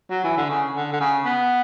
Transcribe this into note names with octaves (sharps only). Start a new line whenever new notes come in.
F#3
E3
D3
C#3
D3
D3
C#3
B3